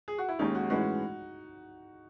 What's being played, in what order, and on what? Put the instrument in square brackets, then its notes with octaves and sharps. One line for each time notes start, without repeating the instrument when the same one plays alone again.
[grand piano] G#4
F#4
E4
[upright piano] D#2 D#3 G#3 C#4 [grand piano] D#4
[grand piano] F#4
[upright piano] A2 E3 G#3 C#4 [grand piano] F#4